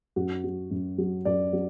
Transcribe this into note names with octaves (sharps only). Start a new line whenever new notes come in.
F#2 F#4
F#3
F#2
F#3
F#2 D5
F#3